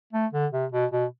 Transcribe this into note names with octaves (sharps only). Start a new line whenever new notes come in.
A3
D3
C3
B2
B2